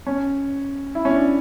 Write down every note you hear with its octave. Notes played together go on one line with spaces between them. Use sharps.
C#4
E4
C#4
D4